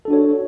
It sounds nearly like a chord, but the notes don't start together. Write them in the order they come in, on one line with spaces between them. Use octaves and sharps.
A4 D4 F#4 C#5